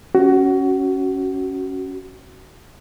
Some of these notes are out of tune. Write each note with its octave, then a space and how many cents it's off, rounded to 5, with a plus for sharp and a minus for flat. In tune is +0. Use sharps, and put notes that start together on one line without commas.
C#4 +0 F#4 +20